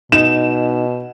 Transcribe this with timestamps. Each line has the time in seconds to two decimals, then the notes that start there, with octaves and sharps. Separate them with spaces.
0.12 B2 D#4 E7